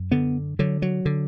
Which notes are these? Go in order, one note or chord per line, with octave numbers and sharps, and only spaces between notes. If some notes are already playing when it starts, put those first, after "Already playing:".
Already playing: F#2
D3 B3
D3 F#3
F#3
D3